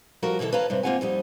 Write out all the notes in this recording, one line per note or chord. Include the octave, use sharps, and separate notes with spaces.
F3 G3 F#4 A4 A#4
B2 D3 E3 A4 A5
B4 C#5 D#5 F5 A5 A#5
G2 C3 B4
A#3 C4 C#4 F4 F#5 G#5
F2 G3 D#4